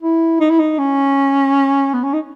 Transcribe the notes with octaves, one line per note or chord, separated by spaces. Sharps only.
E4
D#4
E4
D#4
C#4
B3
C#4
D#4